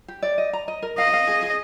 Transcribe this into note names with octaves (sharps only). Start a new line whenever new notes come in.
G4
D5
D#5
A#5
D#5
A#4
D#5 F5
F5
G#4
G#4